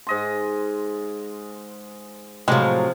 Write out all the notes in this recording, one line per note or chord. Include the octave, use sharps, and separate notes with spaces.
G#2 D#5 C6
A2 C3 F3 F#3 G#3